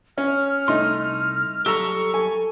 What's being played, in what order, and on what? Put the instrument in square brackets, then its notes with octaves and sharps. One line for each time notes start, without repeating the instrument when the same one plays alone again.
[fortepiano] C#4 [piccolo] F6
[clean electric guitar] C2 C6 [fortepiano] A3 D#4
[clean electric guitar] F#3 G3 G4 [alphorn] A4 [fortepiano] A#5 E6 [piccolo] C#6
[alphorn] A4 [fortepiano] G#5